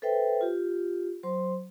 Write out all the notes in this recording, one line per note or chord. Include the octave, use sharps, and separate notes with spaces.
A4 B4 C5 E5 G5
F4 G4
F#3 C5 C6